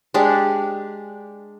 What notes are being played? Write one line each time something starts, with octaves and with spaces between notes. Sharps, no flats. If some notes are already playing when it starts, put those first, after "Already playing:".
G#3 D4 G4